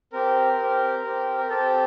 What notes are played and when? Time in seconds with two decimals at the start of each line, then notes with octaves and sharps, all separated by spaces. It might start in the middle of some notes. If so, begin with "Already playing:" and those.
0.13 C4 G4 A#4
0.58 C4 G4
1.04 C4 G4
1.38 A#4
1.49 C4 G4 A4